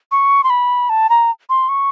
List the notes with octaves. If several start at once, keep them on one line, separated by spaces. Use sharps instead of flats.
C#6
C6
B5
A5
A#5
C6
C#6